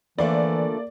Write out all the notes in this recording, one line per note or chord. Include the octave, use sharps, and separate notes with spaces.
D3 E3 F3 A3 A#3 D5